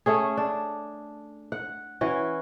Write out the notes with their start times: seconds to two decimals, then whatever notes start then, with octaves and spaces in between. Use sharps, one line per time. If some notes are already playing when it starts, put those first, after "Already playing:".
0.06 A3 C#4 G#4
0.37 D4
1.52 F#5
2.01 E3 C#4 F#4